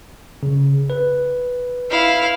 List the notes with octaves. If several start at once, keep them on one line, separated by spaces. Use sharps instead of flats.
C#3
B4
E4 F5